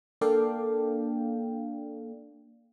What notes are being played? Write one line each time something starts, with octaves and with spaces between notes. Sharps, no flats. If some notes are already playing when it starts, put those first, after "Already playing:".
A#3 D4 A4 D5 F5 G5